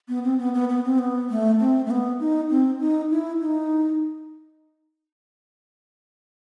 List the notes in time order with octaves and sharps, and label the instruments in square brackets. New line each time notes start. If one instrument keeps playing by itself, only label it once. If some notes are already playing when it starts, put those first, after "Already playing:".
[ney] B3
C4
B3
B3
B3
C4
B3
A3
C4
A3
B3
D#4
C4
D#4
E4
D#4